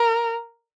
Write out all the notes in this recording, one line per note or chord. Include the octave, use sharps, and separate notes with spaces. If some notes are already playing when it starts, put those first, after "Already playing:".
Already playing: A#4